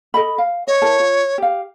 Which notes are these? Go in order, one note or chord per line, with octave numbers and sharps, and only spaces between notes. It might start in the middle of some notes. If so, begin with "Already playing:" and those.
A4 D#5 B5
F5
C#5 D#5
E4 A#4 A5
F4
G4 F5